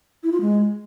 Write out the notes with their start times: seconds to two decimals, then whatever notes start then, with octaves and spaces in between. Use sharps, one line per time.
0.23 E4
0.32 F4
0.41 G#3